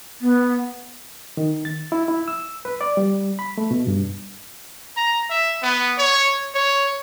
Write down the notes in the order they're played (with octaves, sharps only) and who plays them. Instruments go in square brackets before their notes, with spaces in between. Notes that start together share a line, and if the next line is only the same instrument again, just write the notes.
[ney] B3
[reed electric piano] D#3
A6
E4
E4
E6
B4
D5
G3
B5
A3
B2
G2
[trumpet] A#5
E5
B3
C#5
C#5